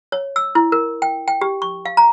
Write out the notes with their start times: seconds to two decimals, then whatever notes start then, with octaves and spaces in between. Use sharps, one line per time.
0.12 C#5
0.36 E6
0.55 E4
0.72 A#4
1.02 G5
1.28 G5
1.41 G4
1.62 C#6
1.85 F5
1.97 A#5